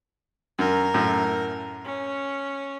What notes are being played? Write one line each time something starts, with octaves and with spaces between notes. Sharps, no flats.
F#2 A#4
F#2 A2
C#4